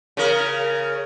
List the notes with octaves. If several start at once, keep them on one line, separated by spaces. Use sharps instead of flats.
C#3 A#4